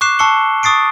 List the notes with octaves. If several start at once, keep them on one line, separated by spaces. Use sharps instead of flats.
C#6 D6 F#6 C7 E7
A5 C#6 E6 C7 C#7 G7
C#6 D#6 A6 C7 D7